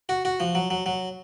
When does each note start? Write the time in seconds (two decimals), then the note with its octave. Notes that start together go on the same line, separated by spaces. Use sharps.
0.09 F#4
0.25 F#4
0.40 F3
0.55 F#3
0.70 F#3
0.86 F#3